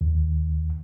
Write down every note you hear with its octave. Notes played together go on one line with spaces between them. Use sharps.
D#2